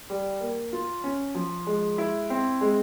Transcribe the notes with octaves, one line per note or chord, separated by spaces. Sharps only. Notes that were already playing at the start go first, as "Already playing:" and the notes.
G3
A#3
F4
C#4
F3
G#3
E4
C4
G#3